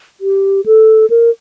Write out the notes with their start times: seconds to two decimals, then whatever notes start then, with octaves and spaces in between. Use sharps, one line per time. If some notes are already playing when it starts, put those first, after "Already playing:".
0.21 G4
0.66 A4
1.10 A#4